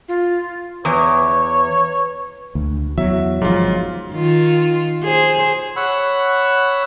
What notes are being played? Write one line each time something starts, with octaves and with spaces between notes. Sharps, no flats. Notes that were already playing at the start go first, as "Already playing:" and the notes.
F4
E2 B4 C#5
D2
E2 F#3 E5
G1 G#2 F3 F#3 F4
D#3 F4
G#4 C5
C#5 F#5 B5 E6